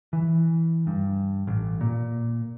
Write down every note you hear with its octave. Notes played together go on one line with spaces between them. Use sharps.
E3
G2
A1
A#2